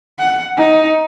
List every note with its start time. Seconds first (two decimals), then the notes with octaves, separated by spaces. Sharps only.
0.19 F#5
0.57 D#4